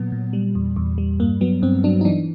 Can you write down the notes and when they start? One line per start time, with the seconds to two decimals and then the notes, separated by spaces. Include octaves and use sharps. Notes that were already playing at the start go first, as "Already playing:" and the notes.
Already playing: A#2 F#3 B3
0.12 A#2
0.33 G3
0.55 E2
0.76 E2
0.98 G3
1.20 G2 A#3
1.41 F#3 B3
1.62 G2 C4
1.84 F#3 D4
2.01 D#4
2.05 E3 D4